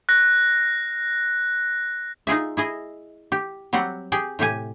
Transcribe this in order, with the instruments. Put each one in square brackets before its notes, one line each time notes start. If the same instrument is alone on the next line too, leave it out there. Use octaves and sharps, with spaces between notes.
[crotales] F#6 A#6
[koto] D#4 F4 G#4 E5
E4 G#4 D#5
G4
F#3 G3 C4 G4 F#5
G4 G#4 G5 G#5
A2 C3 G4 G#5